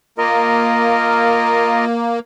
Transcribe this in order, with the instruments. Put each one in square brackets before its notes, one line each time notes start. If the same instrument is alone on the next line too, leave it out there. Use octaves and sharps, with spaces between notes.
[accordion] A#3 [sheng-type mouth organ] F4 A#4 D#5